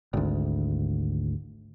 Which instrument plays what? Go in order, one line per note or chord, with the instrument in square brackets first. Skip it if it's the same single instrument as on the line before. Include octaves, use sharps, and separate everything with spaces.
[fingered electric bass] G#1 D2